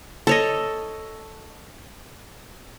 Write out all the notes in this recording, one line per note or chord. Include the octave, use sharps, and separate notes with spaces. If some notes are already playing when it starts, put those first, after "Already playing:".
A4 C#5 D#5